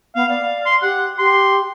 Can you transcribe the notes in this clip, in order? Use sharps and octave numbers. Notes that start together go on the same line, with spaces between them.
B3 F5
D5 F5
C6
G4 F#5
G4 C6